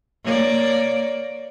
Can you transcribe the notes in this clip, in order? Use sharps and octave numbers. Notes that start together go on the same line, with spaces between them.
A#3 C#5 D5